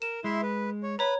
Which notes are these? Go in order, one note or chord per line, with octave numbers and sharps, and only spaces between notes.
A#4 E7
G#3 E4 E5 C6
B4
C#5
B4 C#5 A#5 B5